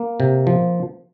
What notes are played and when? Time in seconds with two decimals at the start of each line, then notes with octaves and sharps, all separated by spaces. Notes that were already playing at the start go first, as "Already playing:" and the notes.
Already playing: A#3
0.20 C3
0.47 F3